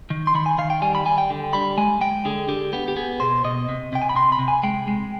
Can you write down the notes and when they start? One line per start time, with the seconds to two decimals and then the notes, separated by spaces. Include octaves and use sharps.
0.10 D#3
0.27 C6
0.35 D#3 B5
0.46 G#5
0.58 D#3 F5
0.70 G5
0.82 G3 G#5
0.95 B5
1.05 G3 G#5
1.18 G5
1.30 D3
1.53 G3 B5
1.78 G#3 G#5
2.01 G#3 G5
2.25 D3 G#4
2.48 D3 G4
2.73 B3 G4
2.88 G4
2.97 B3 G#4
3.20 B2 C5
3.45 B2 D#5
3.69 C3
3.93 C3 G5
4.02 G#5
4.09 B5
4.15 C3 C6
4.32 B5
4.39 C3
4.48 G#5
4.63 G#3 G5
4.88 G#3